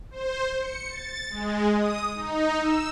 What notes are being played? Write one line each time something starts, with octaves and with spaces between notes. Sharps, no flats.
C5
C#7
A6
G#3
D#6
D#4
E6